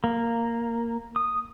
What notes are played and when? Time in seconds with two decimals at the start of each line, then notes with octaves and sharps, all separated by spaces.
0.04 A#3
1.16 D#6